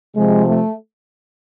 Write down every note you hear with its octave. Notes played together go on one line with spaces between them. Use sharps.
C3 F3 G#3
A3